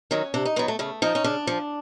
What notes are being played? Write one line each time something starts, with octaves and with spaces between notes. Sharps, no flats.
D#3 F#3 C#4
C3 D4
D#4
D#3 F#3 B3
A3
C#3 A3
F3 D#4
C#4
C#3 D4
F3